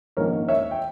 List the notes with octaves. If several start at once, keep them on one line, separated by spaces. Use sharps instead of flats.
A#1 G#2 D#3 A#3 C#4 A#4 C#5
C#5 E5
G5